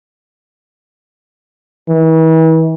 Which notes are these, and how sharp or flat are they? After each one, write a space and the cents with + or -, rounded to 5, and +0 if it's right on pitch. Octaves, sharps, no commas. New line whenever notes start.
E3 -40